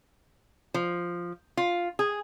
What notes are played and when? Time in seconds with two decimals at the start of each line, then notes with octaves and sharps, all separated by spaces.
0.74 F3
1.57 F4
1.99 G#4